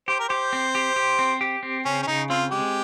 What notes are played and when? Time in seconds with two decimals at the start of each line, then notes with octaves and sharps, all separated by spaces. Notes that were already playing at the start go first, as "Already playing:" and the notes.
0.08 G4 C5
0.19 A#4
0.29 G4 C5
0.53 C4
0.75 G4
0.96 G4
1.19 C4
1.41 G4
1.63 C4
1.85 C#3 C#4
2.03 C#4
2.07 C#3 D#4
2.30 C4 F4
2.51 G#3 G4